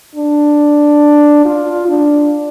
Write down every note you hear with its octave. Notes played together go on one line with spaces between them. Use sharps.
D4
F4
D4